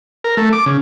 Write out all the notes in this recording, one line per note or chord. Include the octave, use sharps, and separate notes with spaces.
A#4
A3
D6
C#3